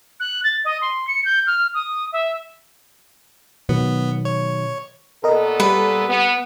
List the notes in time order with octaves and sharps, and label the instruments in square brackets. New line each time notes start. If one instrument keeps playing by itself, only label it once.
[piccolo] F#6
A6
D#5
C6
C#7
G6
F6
D#6
E5
[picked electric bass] B2 D#3 F#3 [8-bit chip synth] B3
[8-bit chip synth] C#5
[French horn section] A#2 B3 A4 [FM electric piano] A#4 D#5
[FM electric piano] G3 [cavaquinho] B4
[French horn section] B3